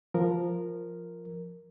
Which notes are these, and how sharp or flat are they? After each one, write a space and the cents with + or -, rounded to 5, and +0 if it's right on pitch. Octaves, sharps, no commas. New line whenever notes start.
F3 +0 A#4 +0